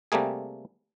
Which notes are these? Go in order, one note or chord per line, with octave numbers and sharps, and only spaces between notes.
C3 G3 A3 A#3 G#4